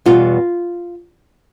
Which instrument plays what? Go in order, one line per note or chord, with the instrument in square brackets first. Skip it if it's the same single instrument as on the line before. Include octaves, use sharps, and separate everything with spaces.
[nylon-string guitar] E2 B2 G3 F4